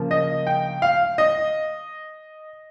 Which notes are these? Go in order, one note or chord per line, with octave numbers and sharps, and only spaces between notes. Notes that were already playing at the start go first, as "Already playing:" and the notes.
Already playing: C#3 F3 A#3
D#5
G5
F5
D#5